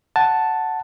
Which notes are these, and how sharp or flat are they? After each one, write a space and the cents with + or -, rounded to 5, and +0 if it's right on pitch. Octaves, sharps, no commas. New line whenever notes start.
F#5 +0 A5 +0